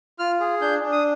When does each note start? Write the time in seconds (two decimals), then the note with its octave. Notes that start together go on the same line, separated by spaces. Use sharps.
0.19 F4 F6
0.40 G#4
0.61 D4 G6
0.83 D4
0.92 D#6